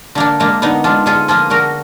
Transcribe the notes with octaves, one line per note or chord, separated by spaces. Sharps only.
D3 A#3 D4
G#3 A#3 D4
D3 B3 D#4
G#3 D4 F4
D3 F4 G#4
F3 A#3 F4 G#4
D3 F#4 A#4